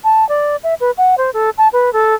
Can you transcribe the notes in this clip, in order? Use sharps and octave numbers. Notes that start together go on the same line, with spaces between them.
A5
D5
E5
B4
F#5
C5
A4
A5
B4
A4